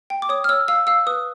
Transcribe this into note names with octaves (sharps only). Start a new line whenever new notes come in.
G5
D6
C#5 D#6
F6
C#5 E6
F5 E6
F5 E6
B4 D#6